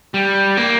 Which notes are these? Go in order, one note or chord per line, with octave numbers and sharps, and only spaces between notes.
G3
A#3